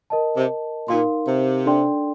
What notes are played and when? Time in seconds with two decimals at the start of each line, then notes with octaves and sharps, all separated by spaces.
0.10 A#4 D#5 A5
0.37 C3
0.88 A#2 D#4 A#4 F5 C6
1.27 C3
1.66 D4 A4 D5 G5 C6